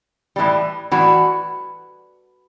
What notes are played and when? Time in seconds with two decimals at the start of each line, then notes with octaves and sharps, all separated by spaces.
0.36 A2 E3 G3
0.91 A2 E3 G3 F#4